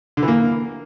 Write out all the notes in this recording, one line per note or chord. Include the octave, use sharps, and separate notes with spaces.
D3
E3
A#3